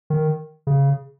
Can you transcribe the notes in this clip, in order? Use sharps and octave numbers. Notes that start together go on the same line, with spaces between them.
D#3
C#3